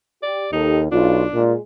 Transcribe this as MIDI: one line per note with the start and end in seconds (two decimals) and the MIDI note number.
0.22 0.47 67
0.22 0.51 74
0.53 0.90 39
0.53 0.80 63
0.53 0.82 67
0.53 0.82 69
0.92 1.24 35
0.92 1.42 62
0.92 1.24 65
1.34 1.53 46
1.34 1.59 56